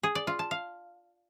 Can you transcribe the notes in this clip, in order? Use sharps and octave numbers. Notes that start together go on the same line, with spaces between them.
G#4
D5
F4
A5
F5